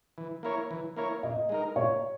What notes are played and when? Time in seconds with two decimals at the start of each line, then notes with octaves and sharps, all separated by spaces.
0.18 E3
0.43 A#3 E4 A#4 C#5
0.71 E3
0.96 A#3 E4 A#4 C#5
1.23 A#2 D#5
1.49 G#3 D#4 A#4
1.76 A#2 C#5